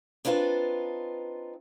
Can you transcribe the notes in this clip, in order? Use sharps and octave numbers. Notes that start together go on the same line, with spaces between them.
C4 D4 D#4 F4 B4